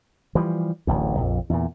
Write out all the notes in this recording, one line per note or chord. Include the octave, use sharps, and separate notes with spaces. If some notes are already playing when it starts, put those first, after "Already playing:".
E3 F3 G3
D1 A1 D2
A#1 F2
E2 A#2